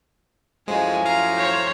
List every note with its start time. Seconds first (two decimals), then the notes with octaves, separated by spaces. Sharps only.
0.68 F#2 A2 F3 G#3 G#5
1.06 F5 A#5
1.37 C5 C#5